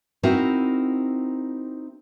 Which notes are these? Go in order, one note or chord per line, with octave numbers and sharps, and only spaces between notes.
C4 D#4 E4 F#4 A#4